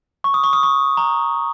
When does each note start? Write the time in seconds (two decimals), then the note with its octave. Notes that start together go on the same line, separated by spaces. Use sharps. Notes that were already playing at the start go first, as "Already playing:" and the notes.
0.24 C#6
0.34 D#6
0.44 C#6
0.53 D#6
0.63 C#6
0.97 A#5